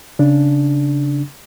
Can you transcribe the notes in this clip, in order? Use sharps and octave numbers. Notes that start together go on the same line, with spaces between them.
C#3 D4